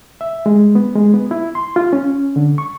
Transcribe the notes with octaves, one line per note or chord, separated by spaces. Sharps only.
E5
G#3
B3
G#3
B3
E4
C6
F4
C#4
D3
C#6